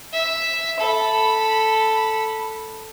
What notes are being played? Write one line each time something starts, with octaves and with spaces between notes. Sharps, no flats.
E5
A4 B5